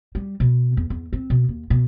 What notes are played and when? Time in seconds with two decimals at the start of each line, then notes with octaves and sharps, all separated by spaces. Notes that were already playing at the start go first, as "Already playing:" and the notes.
0.15 G3
0.40 B2
0.77 E2
0.90 E2
1.13 C4
1.30 B2
1.49 D#2
1.70 B2